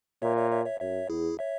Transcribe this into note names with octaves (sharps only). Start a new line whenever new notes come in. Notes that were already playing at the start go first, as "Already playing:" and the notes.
A#2 C#5 E5
C#5 E5
C#5 E5
C#5 E5
F#2 C#5 E5
E2 E4 G#4
C#5 E5